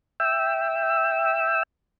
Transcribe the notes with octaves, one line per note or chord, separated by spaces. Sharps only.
E5 G5 E6